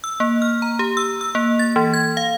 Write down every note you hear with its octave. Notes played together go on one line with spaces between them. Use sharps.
E6
A#3
F6
A#5
G4
E6
E6
A#3
A6
E3
G#6
F5